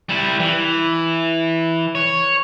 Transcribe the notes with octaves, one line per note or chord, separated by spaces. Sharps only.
G3 E4
E3
C#5